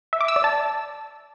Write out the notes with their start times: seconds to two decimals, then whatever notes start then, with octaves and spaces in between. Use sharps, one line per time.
0.13 E5
0.21 D6
0.28 E6
0.36 D5
0.44 A5